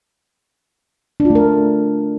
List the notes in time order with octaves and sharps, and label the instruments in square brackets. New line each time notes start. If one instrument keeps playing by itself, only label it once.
[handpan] D4
F4
A3
A#4